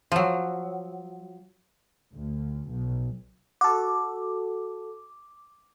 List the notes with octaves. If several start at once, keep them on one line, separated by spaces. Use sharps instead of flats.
F3 F#3
D2
B1
F#4 A4 D6